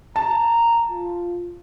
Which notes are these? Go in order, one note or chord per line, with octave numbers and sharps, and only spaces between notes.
A5 A#5
F4